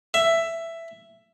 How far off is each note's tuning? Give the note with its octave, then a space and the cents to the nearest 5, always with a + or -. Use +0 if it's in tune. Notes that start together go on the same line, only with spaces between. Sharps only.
E5 +10